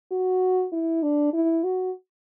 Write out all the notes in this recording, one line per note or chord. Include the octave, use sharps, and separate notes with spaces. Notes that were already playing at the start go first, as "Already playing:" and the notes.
F#4
E4
D4
E4
F#4